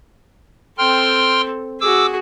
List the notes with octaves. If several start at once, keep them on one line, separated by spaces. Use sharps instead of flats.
C4 A4 G5 C6 F6
F#4 G#4 D6 E6